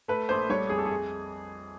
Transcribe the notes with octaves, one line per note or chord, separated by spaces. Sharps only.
A3 B4
A#1 C5
G3 C#5
F2 G#4
A4
G#4